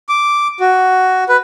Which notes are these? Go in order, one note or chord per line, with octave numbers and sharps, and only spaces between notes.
D6
F#4
B4